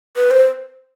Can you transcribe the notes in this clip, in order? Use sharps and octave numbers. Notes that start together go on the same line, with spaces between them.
B4
C5